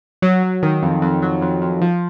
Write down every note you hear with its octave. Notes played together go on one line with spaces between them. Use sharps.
F#3
F#3
D#3
F2
F2
F#3
F2
F2
F3